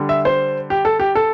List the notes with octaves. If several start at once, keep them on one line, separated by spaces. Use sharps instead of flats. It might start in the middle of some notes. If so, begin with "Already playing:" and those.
Already playing: D3 G3
E5
C5
G4
A4
G4
A4